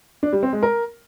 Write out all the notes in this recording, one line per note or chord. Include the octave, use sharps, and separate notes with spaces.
D4
G3
C4
G#3
A#4